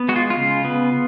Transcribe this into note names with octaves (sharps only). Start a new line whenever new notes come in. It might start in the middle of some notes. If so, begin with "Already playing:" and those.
Already playing: B3
G#3 F#4
F4
F4
C#3
B3